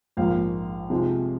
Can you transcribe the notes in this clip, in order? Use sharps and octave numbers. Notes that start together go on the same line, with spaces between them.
A#1 G#2 F3 A#3 F5
F2 C3 F3 G#3